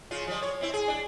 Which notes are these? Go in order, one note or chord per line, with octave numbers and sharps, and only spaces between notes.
C#3 F4
F3 G3
C#5
C4 E4
G#4
D4